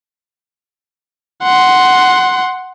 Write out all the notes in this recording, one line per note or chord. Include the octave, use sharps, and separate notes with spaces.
F#5 C6